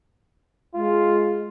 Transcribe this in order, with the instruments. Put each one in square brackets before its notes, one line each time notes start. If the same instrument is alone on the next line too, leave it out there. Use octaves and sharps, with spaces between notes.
[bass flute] G#3 [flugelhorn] F4